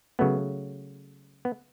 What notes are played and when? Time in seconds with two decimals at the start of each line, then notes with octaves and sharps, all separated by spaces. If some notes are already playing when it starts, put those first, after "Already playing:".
0.19 C#3 F#3 A3 B3
1.45 B3